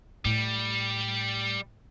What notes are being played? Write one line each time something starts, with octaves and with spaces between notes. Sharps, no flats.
A2 G3